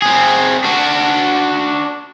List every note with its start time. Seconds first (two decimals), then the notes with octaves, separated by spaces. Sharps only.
0.02 C4 G#4
0.64 D4 F#4